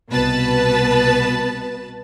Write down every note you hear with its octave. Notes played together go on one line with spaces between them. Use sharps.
C2 B2 B3 B4 A5